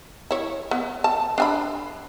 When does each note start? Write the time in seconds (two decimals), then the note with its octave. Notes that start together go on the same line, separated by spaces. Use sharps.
0.31 E4 C#5
0.71 B3
1.04 A5
1.38 D4 G#5 B5